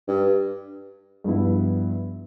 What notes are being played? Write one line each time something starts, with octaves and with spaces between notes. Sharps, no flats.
G2
G2 F3 B3 E4